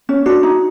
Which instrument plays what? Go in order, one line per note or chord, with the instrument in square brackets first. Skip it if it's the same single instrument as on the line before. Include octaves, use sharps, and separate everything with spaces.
[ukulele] C#4
[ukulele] D4 [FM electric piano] F#4
[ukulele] D#4